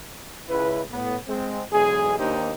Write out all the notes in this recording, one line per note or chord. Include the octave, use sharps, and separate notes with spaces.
C#2 E4 B4
A2 B3
G#3 C4
B1 E2 G#3 G#4
D#2 A#3 D4 D#4 G4 C5